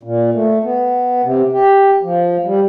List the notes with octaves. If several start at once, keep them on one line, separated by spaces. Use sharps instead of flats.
A#2
A3
B3
C3
G4
F3
G3